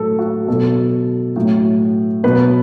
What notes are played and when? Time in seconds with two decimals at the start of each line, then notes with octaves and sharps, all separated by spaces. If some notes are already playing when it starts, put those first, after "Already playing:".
Already playing: A2 F#3 A4
0.19 F#4
0.48 B2 F#3 A4
1.36 A2 F#3
2.24 B2 F#3 B4